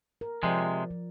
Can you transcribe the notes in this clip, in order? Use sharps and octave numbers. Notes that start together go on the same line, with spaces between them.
A#4
C3 F3 G#3 D5
F3